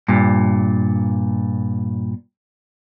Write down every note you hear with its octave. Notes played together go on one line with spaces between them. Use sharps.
G2 A#2